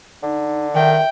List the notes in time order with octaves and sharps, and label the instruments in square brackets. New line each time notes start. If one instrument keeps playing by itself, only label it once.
[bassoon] D3 [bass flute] D#4
[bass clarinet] D#3 [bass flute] E5 [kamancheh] G5